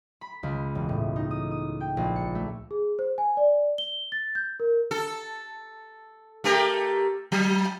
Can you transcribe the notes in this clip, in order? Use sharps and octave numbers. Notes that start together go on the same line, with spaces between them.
B5
C#2
E1
A2
D#4
D#6
D#6
G5
A#1
C#7
A3
G#4
C5
G#5
D5
G7
A6
G6
A#4
A4
A3 G4 A#4
F#3